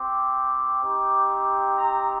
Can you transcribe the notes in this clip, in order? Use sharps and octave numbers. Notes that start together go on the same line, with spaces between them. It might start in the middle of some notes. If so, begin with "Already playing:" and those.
Already playing: C4 G4 D6
C4 D#4 G4
A#5